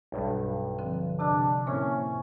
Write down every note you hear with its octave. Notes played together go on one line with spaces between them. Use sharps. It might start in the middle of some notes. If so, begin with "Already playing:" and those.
B1 G2
D3 F3 C4
C3 D4 G4 D#5
A2 A#3 C4 C#4 E4 A#4